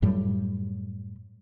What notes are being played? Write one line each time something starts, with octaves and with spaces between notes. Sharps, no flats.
F#2 A2 F#3 G3